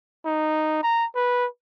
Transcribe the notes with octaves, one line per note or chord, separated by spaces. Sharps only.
D#4
A#5
B4